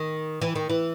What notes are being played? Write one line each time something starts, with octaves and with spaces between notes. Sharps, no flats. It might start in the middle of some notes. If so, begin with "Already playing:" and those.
Already playing: D#3
E3
D#3
E3